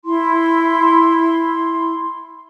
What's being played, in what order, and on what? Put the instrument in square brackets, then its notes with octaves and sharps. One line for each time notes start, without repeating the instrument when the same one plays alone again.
[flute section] E4 C6